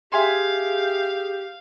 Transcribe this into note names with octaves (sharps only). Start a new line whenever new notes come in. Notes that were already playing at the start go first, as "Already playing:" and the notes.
G4 G#4 E5 F5 G#5 C6